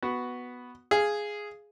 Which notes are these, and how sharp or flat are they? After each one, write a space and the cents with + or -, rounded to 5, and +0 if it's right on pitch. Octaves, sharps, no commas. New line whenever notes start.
B3 +0 F#4 +0
G#4 +0 F5 -15